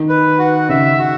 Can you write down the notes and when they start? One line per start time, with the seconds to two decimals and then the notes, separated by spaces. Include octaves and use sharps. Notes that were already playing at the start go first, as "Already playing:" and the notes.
Already playing: D#3 D#4
0.09 B4
0.38 F#4
0.69 C#3 C#4 E5
0.99 F#4